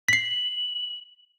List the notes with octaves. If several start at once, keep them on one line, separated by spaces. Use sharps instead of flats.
B6 C7 F#7